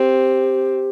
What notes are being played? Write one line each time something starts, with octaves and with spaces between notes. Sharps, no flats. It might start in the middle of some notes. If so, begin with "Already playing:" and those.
Already playing: C4 G4